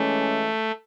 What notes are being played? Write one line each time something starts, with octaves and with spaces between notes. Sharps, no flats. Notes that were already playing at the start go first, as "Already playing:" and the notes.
Already playing: E3 G#3 A3 C#4